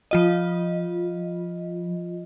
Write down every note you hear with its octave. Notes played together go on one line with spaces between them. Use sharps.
F3 F4 D#5